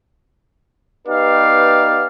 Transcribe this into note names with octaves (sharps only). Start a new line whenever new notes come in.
B3 D#4 G4 B4 D5 F5